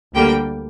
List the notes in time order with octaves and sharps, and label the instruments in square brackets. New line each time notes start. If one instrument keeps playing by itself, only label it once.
[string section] D2 D3 G3 A#3 G5